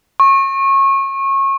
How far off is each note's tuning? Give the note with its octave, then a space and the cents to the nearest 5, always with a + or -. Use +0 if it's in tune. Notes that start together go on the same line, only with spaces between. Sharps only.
C#6 -25